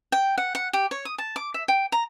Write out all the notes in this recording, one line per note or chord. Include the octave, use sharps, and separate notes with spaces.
G5
F#5
F#5
G4
C#5
D#6
A5
D6
E5
G5
A#5